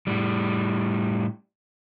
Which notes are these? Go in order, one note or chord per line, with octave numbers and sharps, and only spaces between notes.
A2 G3